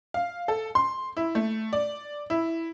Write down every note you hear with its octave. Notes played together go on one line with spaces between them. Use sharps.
F5
A4
C6
E4
A3
D5
E4